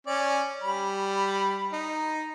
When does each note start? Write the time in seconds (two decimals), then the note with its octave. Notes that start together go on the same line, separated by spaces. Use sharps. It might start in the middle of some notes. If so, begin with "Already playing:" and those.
0.07 C#4 D5
0.63 G3 B5
1.73 D#4